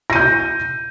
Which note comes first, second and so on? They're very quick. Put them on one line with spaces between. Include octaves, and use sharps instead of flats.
A#6 D#7 G6